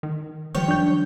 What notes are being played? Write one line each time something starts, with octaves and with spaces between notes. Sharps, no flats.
D#3
D#3 F3 G3 C#5 G5
F#2 D4 G6